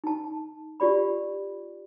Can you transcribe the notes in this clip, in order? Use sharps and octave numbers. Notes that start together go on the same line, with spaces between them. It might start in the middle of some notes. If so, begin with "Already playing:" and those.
D#4 A5
F4 G4 D5 B5